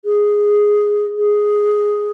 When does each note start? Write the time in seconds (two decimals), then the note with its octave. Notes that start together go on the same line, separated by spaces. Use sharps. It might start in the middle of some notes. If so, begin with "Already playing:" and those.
0.05 G#4
1.17 G#4